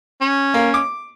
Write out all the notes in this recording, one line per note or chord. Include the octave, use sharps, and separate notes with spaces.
C#4
A#3
D6